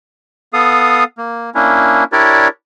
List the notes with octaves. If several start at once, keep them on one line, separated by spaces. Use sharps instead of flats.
B3 A4 F5 D#6
A#3
A#3 C#4 D4 E4
D4 E4 G4 A#4 C#5 D5